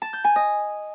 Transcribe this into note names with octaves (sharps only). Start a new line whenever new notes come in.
A5
G6
G#5
D#5